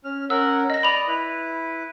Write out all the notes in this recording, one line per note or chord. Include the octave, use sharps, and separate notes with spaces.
C#4 F6
C#4 A#4 F#5 E6
D#5 A#6
D5 D#5 B5 F7
E4 B4